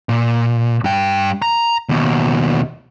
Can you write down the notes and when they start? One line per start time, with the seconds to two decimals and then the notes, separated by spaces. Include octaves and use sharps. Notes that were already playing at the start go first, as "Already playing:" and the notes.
0.09 A#2
0.84 G2 G5
1.42 A#5
1.89 D#2 B2